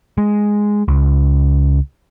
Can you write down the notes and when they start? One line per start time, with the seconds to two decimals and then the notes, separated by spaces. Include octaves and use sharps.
0.18 G#3
0.88 C#2